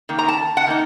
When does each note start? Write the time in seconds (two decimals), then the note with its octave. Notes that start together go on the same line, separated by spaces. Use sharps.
0.09 D#3 A#3
0.19 A#5
0.28 A5
0.57 F#5
0.67 D#3 A#3 D#4